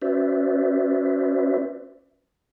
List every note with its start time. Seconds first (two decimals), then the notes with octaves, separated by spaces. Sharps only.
0.02 C#4 F#4 B4 C5 D5 E5